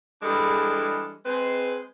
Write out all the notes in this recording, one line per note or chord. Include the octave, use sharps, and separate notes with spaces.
E3 G3 G#3 D4 G#4 A4
G#3 C4 B4